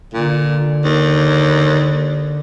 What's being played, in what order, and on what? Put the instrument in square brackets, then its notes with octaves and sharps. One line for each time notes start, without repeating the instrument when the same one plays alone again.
[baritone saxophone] A#2 [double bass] D3
[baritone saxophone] D#2